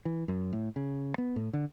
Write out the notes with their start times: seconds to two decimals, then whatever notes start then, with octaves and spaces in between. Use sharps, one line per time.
0.05 E3
0.28 F#2
0.53 A2
0.76 C#3
1.18 B3
1.36 A2
1.53 D3